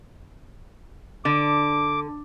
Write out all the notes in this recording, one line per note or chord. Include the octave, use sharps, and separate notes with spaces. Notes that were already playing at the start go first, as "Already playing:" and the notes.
D3 D6